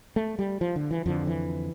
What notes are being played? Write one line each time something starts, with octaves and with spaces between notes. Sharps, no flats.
A3
G3
F3
D3
E3
F2 D3 F3
E3